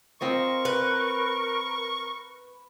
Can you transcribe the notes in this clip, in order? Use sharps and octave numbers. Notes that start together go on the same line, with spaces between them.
C4 F4 A#4 D#5 C#6
B4